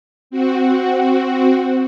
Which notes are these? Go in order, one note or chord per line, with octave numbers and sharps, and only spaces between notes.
C4 F#4